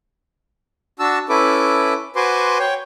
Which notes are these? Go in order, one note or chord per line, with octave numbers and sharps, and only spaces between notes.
D4 F#4 A5 E6
C#4 E4 A4 B4 D6
F#4 B4 C5 G#5 C6 D6
C#5 G5